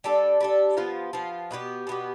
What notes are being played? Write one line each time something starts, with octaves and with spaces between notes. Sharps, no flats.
G3 D4 A4
G3 D4 A4
F3 B3 F4
F3 B3 F4
B2 B3 E4 G4
B2 B3 E4 G4